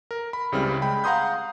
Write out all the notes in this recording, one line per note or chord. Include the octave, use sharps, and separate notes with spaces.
A#4
B5
C#2 C#3 G3 C4 E4 F6
G#3 G5 B5
F5 F#5 A#5 C6 D#6 G6